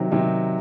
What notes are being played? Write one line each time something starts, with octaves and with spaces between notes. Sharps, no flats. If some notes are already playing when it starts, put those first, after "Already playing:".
Already playing: C3 D#3 F#3
C3 D#3 F#3